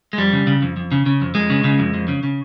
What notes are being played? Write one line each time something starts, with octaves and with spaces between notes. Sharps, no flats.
G#3
F2 G3
C#3
C#3
F2
F2
C#3
C#3
F2
F2 G#3
C#3
C#3
F2
F2
C#3
C#3